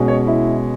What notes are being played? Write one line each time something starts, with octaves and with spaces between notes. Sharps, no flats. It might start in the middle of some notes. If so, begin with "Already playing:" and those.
Already playing: B2 G#3 C#4
C#5
E4